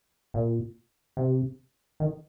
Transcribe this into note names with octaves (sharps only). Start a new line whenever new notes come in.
A#2
C3
D#3